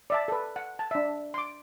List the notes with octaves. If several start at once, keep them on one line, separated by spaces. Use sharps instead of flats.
D5 E5 A5
A4 B4
F#5
A5
D4 E5
C6 D6